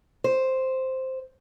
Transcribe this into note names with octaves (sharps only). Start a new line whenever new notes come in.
C5